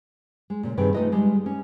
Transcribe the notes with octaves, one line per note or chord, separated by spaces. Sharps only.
G#3
A#2 C#3
G2 C3 D#3 G#4 B4 G5
A3 B3 D#4 F4 B4 D#5
G3 G#3
C#4